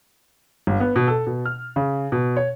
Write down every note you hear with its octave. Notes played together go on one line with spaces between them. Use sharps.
G1
B3
B2
A4
B2
F6
C#3
B2
C#5